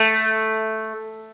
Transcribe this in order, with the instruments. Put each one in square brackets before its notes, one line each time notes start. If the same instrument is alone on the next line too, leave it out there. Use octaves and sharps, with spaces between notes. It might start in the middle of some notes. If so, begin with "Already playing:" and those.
Already playing: [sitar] A3